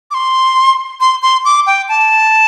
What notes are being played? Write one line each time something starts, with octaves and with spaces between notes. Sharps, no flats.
D6
C6
C6
C6
D6
G5
A5